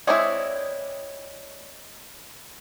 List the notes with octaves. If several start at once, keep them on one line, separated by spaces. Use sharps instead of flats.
G#3 C4 E4 C#5 D5 D#6